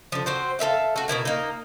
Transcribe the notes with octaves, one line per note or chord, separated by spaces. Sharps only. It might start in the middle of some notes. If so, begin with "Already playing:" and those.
D3 F3
C4 F#4 C5
A4 A#4 E5 F5
A3 F#4
B2 F3 E4 A#4
A#3 D#4